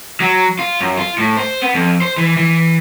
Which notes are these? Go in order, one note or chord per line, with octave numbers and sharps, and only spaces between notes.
F#3
F4
F#2
F4
A2
C5
B3
F2
C5
E3
E3